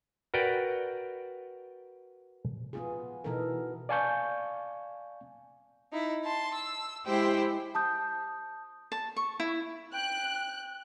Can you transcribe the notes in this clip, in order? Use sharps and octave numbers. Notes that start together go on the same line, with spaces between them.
F#4 A#4 B4 D5 G5
B3 F4 G#4
B2 E3 B3 D#4 A4 A#4
D5 F5 G#5 A5 C#6 G6
D#4 E4
A5 C6
E6
G#3 E4 G4 C5 G5
A5 D#6 G6
A5
C#6
E4
G5 F#6